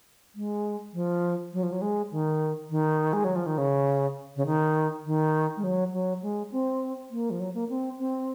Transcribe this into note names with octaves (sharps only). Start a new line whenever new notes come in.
G#3
F3
F#3
F3
F#3
G#3
D#3
D#3
G#3
F#3
F3
D#3
C#3
C#3
D#3
D#3
G#3
F#3
F#3
G#3
C4
A#3
F3
F#3
A#3
C4
C4